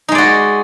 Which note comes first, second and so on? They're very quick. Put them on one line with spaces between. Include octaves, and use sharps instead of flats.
D#4 G#3 D5 F#4